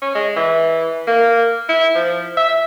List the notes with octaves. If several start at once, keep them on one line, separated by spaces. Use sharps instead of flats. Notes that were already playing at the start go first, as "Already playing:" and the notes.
C#4
G#3
E3
A#3
E4
F3
E5